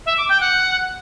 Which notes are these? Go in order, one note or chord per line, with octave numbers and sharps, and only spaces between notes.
E5
D6
G5
F#5